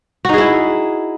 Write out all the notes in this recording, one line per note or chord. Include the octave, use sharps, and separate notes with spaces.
D#4 E4 F#4 G#4